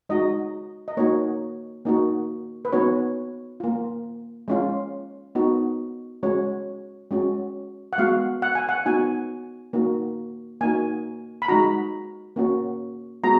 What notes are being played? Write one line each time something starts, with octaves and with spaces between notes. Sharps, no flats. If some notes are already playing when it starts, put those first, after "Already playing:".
G#3 D#4 F#4 D#5
D#5
A#3 D#4 F#4 C#5
A#3 D#4 F#4
B4
B3 D#4 F#4 C#5
A#3 F4
G#3 C#4 F4
B3 D#4 F#4
G#3 C#4 F#4 C#5
G#3 C#4 F#4
F#5
G#3 B3 F#4 F5
F#5
G#5
F#5
B3 D#4 F#4 G#5
A#3 D#4 F#4
A#3 D#4 F#4 G#5
B5
G#3 D#4 F#4 A#5
A#3 C#4 F#4
G#3 B3 F#4 A#5